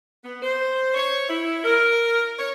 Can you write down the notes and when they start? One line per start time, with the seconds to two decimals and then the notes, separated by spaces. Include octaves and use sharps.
0.23 B3
0.42 C5
0.94 C#5
1.29 E4
1.64 A#4
2.39 C#5